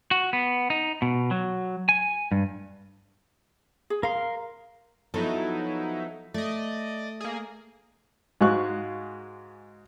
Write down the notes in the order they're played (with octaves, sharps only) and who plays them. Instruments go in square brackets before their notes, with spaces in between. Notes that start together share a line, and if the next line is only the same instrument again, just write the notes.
[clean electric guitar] F#4
B3
D#4
B2
F#3
G#5
G2
[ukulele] G#4
[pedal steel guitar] A#4 C6 [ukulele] F5
[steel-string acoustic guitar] F3 B3 A4 [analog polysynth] F#3 D#4 E4
[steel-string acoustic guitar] A3 [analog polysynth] D5 D#5
[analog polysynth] A#3 G#4
[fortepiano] G#2 G#3 F#4 F5 C#6 F#6